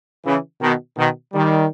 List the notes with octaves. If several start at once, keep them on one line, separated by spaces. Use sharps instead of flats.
C#3 E3
B2 D#3
B2 D#3
D#3 G3